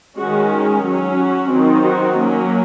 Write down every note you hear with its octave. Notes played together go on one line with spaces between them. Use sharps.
D#3 G#3 C#4 F#4
F#3 C#4
F#4
D#3 F#3 C4 D#4
F#4
F#3 A#3 C#4